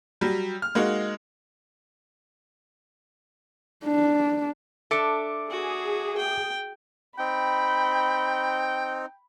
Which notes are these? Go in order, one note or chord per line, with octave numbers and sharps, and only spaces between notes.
F#3 G3
F6
G#3 A#3 D#4 F#4
D4
D4 A4 E5 D6 C#7
F#4 G#4
G5
C4 D#4 G5 B5